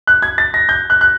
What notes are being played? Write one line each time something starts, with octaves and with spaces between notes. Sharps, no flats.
F#6
G#6
A6
A#6
G6
F#6
F#6